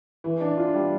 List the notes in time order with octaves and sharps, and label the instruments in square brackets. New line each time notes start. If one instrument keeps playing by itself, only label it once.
[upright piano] E3
D4
F4
G3